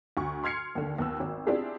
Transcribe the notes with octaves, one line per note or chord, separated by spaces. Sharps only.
D2 C#6
C6 F6 G#6 C7 C#7
D#2 D3
D#2 B3 E6
G#1
C4 D4 E4 F4 G4 G#4